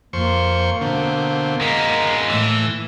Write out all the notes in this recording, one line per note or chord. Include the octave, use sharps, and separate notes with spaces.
F2 A#3 C5 C#6
B2 D3 C4
G#3 B3 A#4
A2 E3 E6